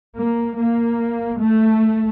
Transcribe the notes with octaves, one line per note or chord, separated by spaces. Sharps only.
A#3
A#3
A3